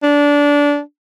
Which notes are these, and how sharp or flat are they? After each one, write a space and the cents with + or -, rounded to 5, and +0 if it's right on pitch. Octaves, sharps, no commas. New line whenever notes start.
D4 -20